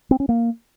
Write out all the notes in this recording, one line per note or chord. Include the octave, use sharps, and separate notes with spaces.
C4
C#4
A#3